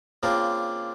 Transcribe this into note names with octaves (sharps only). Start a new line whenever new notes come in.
C#3 A#3 C4 D4 F4 A#4